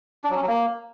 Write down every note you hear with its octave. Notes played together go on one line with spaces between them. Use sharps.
D4
F#3
C#4
F#3
A#3